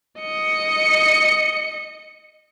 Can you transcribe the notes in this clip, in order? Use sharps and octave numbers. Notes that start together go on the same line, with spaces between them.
D#5 C#7